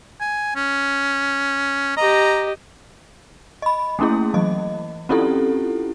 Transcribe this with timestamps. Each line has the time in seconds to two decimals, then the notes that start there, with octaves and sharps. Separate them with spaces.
0.21 G#5
0.56 C#4
1.97 G4 D#5 A#5
3.62 D#5 B5
3.99 A3 A#3 C#4 E4 G#4
4.34 E3 F#3 D#5
5.09 C4 C#4 E4 F4 G4 A4